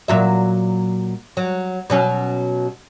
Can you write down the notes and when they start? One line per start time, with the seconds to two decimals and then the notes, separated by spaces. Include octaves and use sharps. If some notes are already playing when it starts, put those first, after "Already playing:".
0.08 A#2 F#3 E5
1.37 F#3
1.90 B2 F#3 C#4